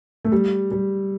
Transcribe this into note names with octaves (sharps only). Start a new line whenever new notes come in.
A3
G3
G3